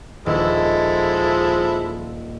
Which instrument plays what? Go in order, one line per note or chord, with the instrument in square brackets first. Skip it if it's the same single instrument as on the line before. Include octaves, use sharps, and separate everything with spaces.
[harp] D#1 [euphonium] F3 [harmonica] G#3 E4 A4